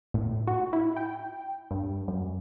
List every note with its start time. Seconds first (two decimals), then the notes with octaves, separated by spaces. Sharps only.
0.14 A2
0.47 F#4
0.73 E4
0.97 G5
1.71 G2
2.08 F#2